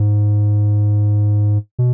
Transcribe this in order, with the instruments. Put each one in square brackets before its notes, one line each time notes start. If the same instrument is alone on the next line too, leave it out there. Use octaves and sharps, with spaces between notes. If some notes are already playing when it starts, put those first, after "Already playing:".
Already playing: [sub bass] G#2
B2